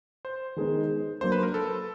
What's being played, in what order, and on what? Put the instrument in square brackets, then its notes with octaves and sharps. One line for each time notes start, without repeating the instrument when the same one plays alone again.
[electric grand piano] C5
[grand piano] D#3 G#3 B3 D#4
[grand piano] F#3 A#3 D4 [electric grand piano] C5
[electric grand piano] B4
A#4
A4